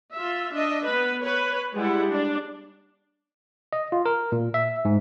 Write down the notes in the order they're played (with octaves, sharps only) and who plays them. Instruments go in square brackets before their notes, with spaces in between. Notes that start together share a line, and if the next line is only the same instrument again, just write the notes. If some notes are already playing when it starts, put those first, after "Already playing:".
[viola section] F4 E5
D4 D#5 E5
B3 B4
B4 C#5
G3 G#3 E4 F#5
D4
[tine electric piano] D#5
F4
A#4
A#2
E5
G#2